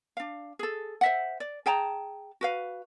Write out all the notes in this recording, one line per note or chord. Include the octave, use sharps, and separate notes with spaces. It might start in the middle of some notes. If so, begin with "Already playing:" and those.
D4 F5
G#4 A4
C5 E5 F#5
D5
G#4 G5 A5 A#5
F#4 B4 F5